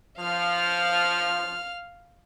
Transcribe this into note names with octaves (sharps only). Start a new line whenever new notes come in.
F3 F5 F6